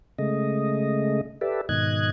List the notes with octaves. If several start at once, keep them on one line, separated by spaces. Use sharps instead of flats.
C#3 G#3 A3 D#5
G4 A4 B4 D5 E5
G#2 B2 D#3 D#5 F#6 G#6